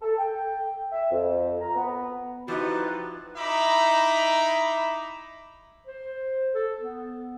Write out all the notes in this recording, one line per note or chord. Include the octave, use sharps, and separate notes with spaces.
A4
G5
E5
F2
A#5
B3
F3 D#4 E4 F#4 G4 B4 D5
D#4 E4 E5 A#5 B5 D6
C5
A4
B3